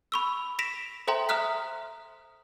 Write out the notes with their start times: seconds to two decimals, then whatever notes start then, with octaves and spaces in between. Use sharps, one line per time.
0.12 B5 C#6 E6
0.59 A#6 B6 D7 E7 F7
1.07 A4 C5 E5 G5 A#5 C6
1.29 E5 A#5 D#6 F6 F#6 B6